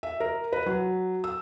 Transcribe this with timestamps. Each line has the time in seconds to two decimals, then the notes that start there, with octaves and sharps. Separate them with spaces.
0.03 E5
0.20 A#4
0.53 B4
0.66 F#3
1.24 E6